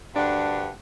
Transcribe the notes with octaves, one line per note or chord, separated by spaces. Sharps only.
D2 G2 D4 F#5